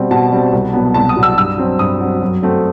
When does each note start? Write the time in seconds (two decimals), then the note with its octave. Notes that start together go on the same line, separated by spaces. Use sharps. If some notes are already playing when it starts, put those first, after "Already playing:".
Already playing: B2 G3 C4
0.11 B2 A5
0.31 G3 C4
0.53 C2
0.73 B2 F#3 B3
0.94 C2 A5
1.09 D#6
1.16 B2 F#3 B3
1.23 E6
1.38 G2 E6
1.58 F#3 C4
1.79 G2 D#6
2.00 F#3 C4
2.22 F#2
2.42 F#3 A3 C4